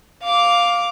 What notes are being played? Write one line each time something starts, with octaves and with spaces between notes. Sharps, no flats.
F5 D6